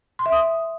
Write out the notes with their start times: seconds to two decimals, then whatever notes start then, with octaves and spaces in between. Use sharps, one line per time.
0.19 C6
0.26 E5
0.32 D#6